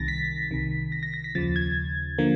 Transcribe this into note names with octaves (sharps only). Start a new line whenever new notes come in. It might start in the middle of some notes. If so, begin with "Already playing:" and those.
Already playing: C2 C3 D#3 A6 A#6
B6
C2 C3 D#3
A#6
A#6
A#6
B6
D#2 C#3 F3 A6
G#6
D3 F3 A#3